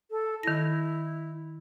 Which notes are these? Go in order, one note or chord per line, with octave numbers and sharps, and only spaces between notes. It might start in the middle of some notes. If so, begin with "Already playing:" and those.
A4
D#3 E4 A#6